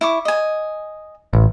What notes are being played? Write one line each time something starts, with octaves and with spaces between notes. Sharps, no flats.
E4 C#6 D6
D#5 G#5
A1